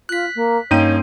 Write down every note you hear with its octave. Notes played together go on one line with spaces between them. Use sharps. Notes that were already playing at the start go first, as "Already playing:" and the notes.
F4 F#6 B6
A#3
G2 A#3 C#4 D#4 C#5 G5 C6 D#7